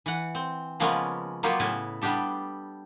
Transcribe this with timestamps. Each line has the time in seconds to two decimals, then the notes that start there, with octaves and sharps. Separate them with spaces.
0.06 E3 F#5
0.35 C4
0.80 C#3 F3 G#3 A#3 B3 C#4
1.43 F#3 A#3 B3 F4 G4
1.60 A2 C#3 B3 E4 G#5
2.02 G3 B3 D4 G4 A4